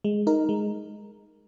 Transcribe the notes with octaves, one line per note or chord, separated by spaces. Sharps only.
G#3
D#4 A#4
G#3